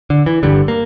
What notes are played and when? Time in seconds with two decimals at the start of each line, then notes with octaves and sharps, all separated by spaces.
0.10 D3
0.26 E3
0.43 G1 G2 D3 G3
0.68 A#3